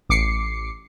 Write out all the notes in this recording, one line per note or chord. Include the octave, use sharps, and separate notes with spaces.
A1 D6 C7 C#7